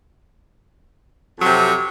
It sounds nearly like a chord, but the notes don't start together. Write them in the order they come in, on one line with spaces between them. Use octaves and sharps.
F2 F#3 C3